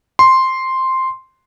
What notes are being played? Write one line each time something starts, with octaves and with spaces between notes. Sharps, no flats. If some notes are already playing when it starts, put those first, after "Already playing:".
C6